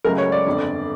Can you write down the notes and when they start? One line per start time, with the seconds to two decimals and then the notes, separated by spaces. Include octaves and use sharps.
0.04 C#2 C#3 F#3 A3 A#4
0.18 C#5
0.32 D5
0.46 G1 F2 D3